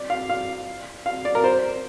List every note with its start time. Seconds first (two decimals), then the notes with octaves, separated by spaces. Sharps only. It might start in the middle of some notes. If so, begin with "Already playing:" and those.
Already playing: D5
0.10 F5
0.30 F5
1.06 F5
1.25 D5
1.35 A#4
1.44 C5